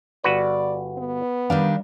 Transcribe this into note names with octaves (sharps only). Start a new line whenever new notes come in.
G1 F#4 B4 D5
B3
D#3 G3 D4 F5